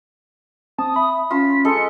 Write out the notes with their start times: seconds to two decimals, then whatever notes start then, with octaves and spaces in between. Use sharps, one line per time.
0.79 C4 A5 D#6
0.96 E5 B5
1.31 C#4 F4 A5 B6
1.65 G#3 A4 D#5 C#7